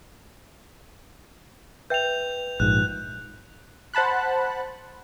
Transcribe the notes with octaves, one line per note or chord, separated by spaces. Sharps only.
B4 E5 G5 G6 F7
A#1 G#2 F#6
C5 F#5 A5 B5 F#6